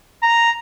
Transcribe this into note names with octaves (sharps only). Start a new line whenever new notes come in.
A#5